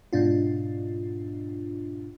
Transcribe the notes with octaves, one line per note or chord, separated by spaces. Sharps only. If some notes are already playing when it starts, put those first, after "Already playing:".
G#2 B2 D4 F4